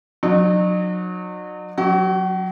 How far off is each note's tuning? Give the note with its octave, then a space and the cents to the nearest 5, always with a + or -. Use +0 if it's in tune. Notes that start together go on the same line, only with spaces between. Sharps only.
F#3 -25 D#4 -45
F#3 -10 F#4 +45